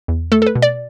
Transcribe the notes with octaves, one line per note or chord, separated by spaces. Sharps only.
E2
A3 A4
A4
B4
B2
D5